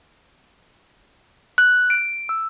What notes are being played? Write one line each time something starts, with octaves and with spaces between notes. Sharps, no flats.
F#6
D7
E6